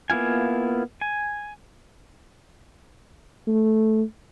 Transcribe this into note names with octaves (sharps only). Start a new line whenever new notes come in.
A#3 B3 E4 F4 G#5
G#5
A3